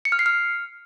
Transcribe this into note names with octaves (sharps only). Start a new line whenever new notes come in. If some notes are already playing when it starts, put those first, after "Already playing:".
C#7
F6
C7
F6